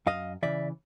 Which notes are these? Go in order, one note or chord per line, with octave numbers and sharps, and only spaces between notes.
F#2 D#5 F5
C#3 E3 D5 E5